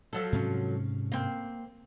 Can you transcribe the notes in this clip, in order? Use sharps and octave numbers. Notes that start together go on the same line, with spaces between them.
F3 F#3 A4
G#2 C3 C#4
A#3 C4